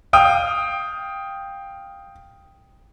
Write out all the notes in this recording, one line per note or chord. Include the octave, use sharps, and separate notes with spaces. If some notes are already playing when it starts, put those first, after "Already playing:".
F5 G5 D#6